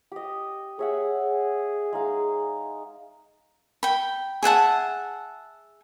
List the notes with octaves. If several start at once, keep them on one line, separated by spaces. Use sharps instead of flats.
G4 D#5
G#4 C#5 E5 F#5
G#4
G#3 D#4 F5
G5 B5
G#4 E5 F#5 A5